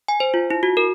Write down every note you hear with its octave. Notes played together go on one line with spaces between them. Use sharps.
G#5
C5
F4
E4
F#4
A#4